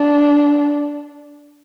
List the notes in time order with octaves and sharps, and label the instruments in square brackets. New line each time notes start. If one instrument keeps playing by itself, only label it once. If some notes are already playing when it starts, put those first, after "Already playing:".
Already playing: [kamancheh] D4